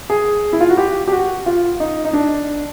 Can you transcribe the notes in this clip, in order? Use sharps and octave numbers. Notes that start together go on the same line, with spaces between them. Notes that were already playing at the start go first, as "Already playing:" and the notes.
G#4
E4
F4
F#4
G4
G4
F#4
F4
D#4
D#4
D4